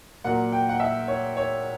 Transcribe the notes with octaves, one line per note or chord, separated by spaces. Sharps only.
A#2 F#3 A#3 F#5
G5
F#5
E5
C#5
C#5